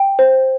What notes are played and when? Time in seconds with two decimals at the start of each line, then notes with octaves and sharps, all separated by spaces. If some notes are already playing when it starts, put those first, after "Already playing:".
Already playing: G5
0.19 C5